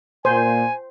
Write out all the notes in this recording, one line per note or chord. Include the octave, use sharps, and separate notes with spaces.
A#2 C5 G#5